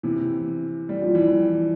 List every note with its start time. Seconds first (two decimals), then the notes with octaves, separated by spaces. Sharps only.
0.03 C3 E3
0.89 G3
1.02 F3
1.15 E3 G3